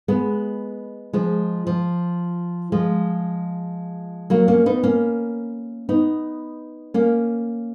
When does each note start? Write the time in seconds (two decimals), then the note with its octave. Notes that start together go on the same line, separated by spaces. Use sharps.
0.08 G#3 B3
1.13 F3 G#3
1.67 F3
2.72 F3 G#3
4.30 F#3 A#3
4.48 A#3 C#4
4.66 B3 D#4
4.83 A#3 C#4
5.89 B3 D#4
6.94 A#3 C#4